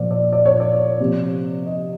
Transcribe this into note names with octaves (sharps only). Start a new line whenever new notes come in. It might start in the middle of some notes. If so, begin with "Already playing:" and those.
Already playing: A#2 F3 D5
D5
D5
C#5
D5
C3 F3
D#5